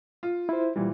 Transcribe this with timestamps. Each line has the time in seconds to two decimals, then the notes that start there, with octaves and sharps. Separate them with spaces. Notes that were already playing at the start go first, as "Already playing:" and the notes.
0.23 F4
0.49 E4 C5
0.76 A#2 E3 G3